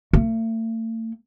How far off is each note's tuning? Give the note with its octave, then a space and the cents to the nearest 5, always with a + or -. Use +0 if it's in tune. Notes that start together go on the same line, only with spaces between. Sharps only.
A3 +40